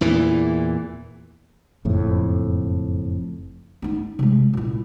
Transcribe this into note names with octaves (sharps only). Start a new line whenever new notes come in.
E2 A#2 E3
F#1 F2 A2
B3 D#4
C3 G#3
A#2 E4